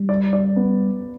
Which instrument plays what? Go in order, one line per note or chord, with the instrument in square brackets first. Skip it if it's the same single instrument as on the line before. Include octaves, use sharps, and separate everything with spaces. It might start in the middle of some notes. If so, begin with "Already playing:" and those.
Already playing: [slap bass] G3
[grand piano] D5
D5
B3